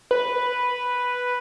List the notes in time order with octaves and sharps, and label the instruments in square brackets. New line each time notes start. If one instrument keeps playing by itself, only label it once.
[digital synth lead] B4